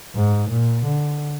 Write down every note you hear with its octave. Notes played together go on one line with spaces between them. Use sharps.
G#2
A#2
D3